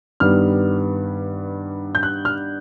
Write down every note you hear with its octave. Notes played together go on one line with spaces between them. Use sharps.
G2 D#3 G3 B3 F6
G6
F#6
F6